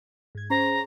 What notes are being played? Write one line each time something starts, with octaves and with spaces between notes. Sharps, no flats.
G#2 G#6
C#4 G#4 C5 A#5